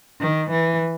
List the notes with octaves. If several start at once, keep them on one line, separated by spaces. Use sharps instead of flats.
D#3
E3